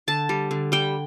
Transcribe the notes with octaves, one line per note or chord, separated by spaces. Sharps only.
D3 A5
G3
D3
G3 G5